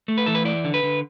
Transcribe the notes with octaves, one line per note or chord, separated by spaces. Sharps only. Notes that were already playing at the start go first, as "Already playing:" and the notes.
A3
B4
E3 A4
B4
E4 D5
D3
B4
D3